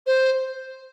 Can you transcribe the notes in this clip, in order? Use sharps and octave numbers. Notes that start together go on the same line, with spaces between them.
C5